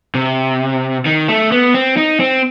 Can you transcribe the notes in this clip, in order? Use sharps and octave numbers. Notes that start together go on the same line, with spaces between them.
C3
D#3
A3
B3
C4
D#4
C4